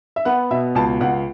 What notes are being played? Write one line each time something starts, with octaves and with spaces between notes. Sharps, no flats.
E5
B3 F#5
B2 E5
C#2 A5
C#2 F#5